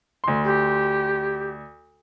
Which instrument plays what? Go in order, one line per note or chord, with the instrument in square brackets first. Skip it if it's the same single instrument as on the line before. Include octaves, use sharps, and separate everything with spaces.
[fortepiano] D2 C6
[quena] G4